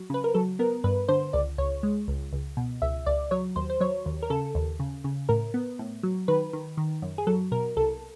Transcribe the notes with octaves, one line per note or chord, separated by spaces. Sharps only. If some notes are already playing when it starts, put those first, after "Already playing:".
Already playing: F#3
C#3 B4
A#4
F#3 A4
B3 A#4
G2 B4
D3 C5
C#2 D5
C#2 C#5
G#3
C#2
C#2
B2
C#2 E5
C#2 D5
F#3 C#5
D#2 C5
C5
F#3 C#5
D#2
A#4
C#3 A4
D#2
C#3
C#3
A2 A#4
B3
A2
F#3
D#3 B4
D#3
D#3
F#2
G#4
F#3 A4
B2 A#4
C2 A4